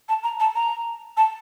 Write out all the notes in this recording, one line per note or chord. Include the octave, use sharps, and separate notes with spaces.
A5
A#5
A5
A#5
A5